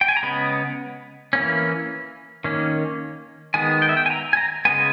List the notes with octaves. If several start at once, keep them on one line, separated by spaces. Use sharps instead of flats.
G5
G#5
A#5
C#3 G#3 B3 B5
E3 A#3 C#4
D#3 A#3 C#4
D#3 G#3 B3 G#5
G5
E5
G5
G#5
A#5
G#5
A#5
C#3 G#3 B3 G#5